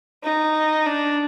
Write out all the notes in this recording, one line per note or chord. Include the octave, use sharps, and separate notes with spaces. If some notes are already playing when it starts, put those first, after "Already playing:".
D#4
D4